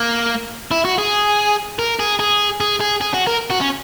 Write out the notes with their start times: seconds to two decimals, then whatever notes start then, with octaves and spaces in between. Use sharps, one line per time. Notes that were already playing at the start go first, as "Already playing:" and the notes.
Already playing: A#3
0.71 E4
0.85 F#4
0.98 G#4
1.79 A#4
1.99 G#4
2.20 G#4
2.60 G#4
2.80 G#4
3.01 G#4
3.14 F#4
3.27 A#4
3.51 F#4
3.61 C#4